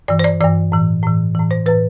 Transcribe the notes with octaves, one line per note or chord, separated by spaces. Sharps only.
G2 E3 D5
C5
D5
G2 E3 D5
A2 E3
A2 E3
A2 E3
C5
A2 E3 B4